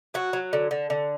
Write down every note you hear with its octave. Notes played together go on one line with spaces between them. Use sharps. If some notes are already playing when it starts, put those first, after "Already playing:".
F#3 F#4
F#3
D3
D3
D3